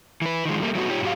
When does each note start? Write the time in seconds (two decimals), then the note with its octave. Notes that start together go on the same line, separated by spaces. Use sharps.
0.21 E3 B4
0.45 D#3 F3 G#3
0.61 G3 A3 A#3
0.75 F#3 G3 A3 B3 D#4 F#4
0.89 D#4 F4 G4 C#5
1.02 G#2 F#3 F#4 G4 F5